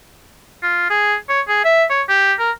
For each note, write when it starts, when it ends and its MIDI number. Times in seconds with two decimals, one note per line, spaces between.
0.63 0.87 65
0.90 1.15 68
1.29 1.41 73
1.48 1.61 68
1.65 1.84 76
1.90 2.02 73
2.09 2.33 67
2.39 2.51 70